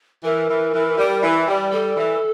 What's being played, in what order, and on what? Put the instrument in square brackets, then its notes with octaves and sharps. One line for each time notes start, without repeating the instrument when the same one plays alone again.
[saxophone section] E3 [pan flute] A#4
[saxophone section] E3
E3
G3
E3
G3
[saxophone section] G3 [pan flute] A4
[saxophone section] E3